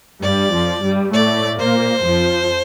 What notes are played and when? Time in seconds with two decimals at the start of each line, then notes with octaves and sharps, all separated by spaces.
0.22 G2 G3 D5
0.53 F2 F3
0.83 G2 G3
1.14 A2 A3 D5
1.59 A#2 A#3 C5
2.06 F2 F3